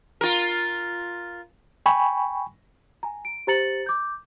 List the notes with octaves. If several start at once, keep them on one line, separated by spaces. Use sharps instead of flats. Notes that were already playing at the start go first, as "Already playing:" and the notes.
F4 A#4
G5 G#5 B5 C#6
G#5 A#5
D7
G4 C5 A#5 A6 C#7 F#7
D6 G6